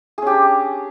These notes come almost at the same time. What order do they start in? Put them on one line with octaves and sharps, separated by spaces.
G#4 C#4 G4 D4